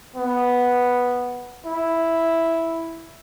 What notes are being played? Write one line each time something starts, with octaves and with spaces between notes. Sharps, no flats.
B3
E4